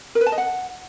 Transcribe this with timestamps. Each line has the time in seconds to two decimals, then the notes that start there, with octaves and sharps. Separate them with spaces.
0.15 A#4
0.21 B4
0.26 A5
0.32 D#5
0.38 F#5